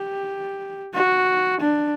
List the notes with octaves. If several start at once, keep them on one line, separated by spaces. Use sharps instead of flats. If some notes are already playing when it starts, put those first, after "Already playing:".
Already playing: G4
F#4
D4